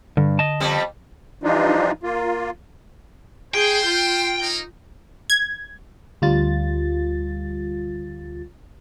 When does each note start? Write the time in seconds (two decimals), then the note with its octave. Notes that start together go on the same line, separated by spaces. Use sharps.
0.17 G2 D3
0.39 D#5 A5
0.60 F2 G3 B3
1.43 E3 F3 G3 D4 D#4 F4
2.03 A#3 F4
3.54 G#4 C5 G5
3.85 F4
4.40 A#3 D#4
5.30 G#6
6.22 D2 G3 F4 A6